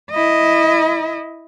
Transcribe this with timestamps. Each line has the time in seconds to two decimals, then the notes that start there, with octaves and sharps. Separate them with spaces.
0.11 E4 D#5